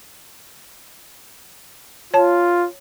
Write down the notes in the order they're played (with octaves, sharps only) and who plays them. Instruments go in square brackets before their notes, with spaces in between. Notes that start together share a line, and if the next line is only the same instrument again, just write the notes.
[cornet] F4 [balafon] C#5 A5